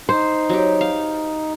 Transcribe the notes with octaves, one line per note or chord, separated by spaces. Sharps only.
D#4 C5
F#3 G4
F5